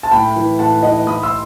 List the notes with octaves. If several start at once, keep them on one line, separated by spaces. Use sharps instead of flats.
A5
A2 G5 B5
E3
A2 F#5 A5
E3 D#5 F#5
A2 B5 D#6
C6 E6